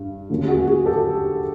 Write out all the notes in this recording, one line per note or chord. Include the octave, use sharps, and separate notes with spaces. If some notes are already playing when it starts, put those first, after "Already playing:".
Already playing: G2 G3
D#2 D3 F#3 A#3 C#4
G4
F#4 G#4
F#4 G#4
G4 A4